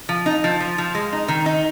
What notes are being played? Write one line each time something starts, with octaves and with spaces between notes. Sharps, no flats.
F3
D#4
F3
F3
F3
G#3
D#4
D#3
D#4